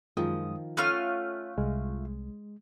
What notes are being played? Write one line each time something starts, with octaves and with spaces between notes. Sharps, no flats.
F#2 D#3 F3 G#3 D#6
A3 C#4 F4 C#5 F#5 F6 F#6
C2 G#3